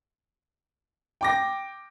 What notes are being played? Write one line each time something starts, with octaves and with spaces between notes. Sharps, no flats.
G5 D6 A#6